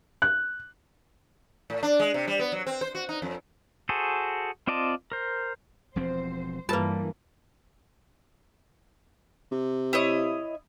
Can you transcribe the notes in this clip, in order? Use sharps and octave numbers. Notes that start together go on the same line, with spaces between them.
F#6
A2
D4
G#3
C3
G3
B3
F#3
C4
C5
F#4
D#4
F2
F#4 G#4 A4 C5
C4 F4 D5 D#5 A5
A#4 C5
E1 F3 C4 C5
G2 E3 G3 A#3 F4 A#4 B4 A5
C3
E4 C#5 D#5